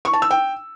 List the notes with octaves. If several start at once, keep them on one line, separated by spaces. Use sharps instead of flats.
C#6
A5
E6
G5